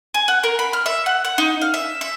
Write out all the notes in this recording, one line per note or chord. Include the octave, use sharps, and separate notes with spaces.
G#5
F#5
A#4
B5
F6
E5
F#5
F#5
D#4
F5
E5
E5